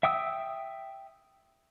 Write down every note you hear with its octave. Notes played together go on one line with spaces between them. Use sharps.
E5 G5 D#6 E6